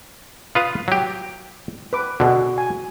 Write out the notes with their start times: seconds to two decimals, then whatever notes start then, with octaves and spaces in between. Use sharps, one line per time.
0.55 F4 B4 F5 D#6
0.88 F#3 G4
1.93 B4 D6
2.20 B2 D3 F#4 G#4
2.58 G#5